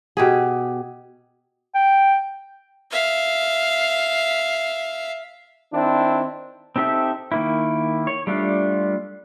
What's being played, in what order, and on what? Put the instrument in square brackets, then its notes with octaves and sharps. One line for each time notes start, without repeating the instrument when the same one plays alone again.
[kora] B2 G4 G#4
[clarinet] G5
[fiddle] E5 F5
[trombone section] D#3 C4 D4 E4
[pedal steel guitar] C4 D#4 G4 A4 E5
D#3 A#3 E4
C#5
G3 A3 D4 F4